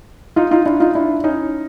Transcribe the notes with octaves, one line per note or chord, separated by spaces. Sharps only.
D#4 F4
D#4 F4
D4 E4
D#4 F4
D4 E4
C#4 D#4